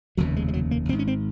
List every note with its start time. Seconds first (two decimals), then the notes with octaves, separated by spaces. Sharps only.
0.17 F1 D#2 C#3 F#3
0.36 G#3
0.48 G#3
0.53 F#3
0.71 A#3
0.89 G#1 C4
0.92 G#2
0.99 C#4
1.08 C4